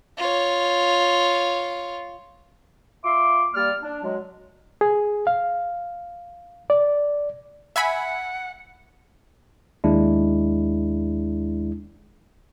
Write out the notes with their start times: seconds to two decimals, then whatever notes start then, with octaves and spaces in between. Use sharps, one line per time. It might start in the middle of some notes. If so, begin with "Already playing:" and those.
0.18 F4 C#5
3.04 F4 E5 C6 D6
3.54 G3 A#3 D5 F6
3.83 D4
4.04 F#3 G#3
4.81 G#4
5.27 F5
6.70 D5
7.76 E5 F#5 G#5 B5
9.84 D#2 G#3 D4 E4